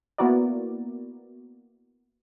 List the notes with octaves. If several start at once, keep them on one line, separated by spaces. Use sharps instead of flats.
A#3 B3 E4 F#4 A#4 D5